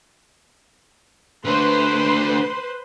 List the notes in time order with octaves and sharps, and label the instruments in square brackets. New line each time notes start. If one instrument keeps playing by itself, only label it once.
[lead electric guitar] D3 A3 [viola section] B4 C5 C6